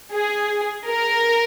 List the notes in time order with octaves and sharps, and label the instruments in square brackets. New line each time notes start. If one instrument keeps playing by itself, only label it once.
[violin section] G#4
A#4